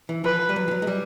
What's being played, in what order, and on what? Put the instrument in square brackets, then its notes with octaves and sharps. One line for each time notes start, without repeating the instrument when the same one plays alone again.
[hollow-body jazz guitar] E3
[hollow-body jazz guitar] F3 [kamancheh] B4
[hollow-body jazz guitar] G3
F#3
F3
F#3
G#3
G3